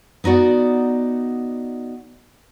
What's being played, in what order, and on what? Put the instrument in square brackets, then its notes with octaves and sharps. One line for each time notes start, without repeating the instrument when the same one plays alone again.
[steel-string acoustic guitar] B3 D#4 F#4 D5 F#5